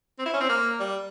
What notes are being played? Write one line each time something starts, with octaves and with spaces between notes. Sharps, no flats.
C4
E4
C#4
C4
A#3
G3